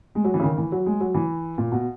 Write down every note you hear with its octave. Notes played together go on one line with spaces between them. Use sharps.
G#3
F#3
E3
C#3
D#3
E3
F#3
G#3
F#3
E3
A#2
B2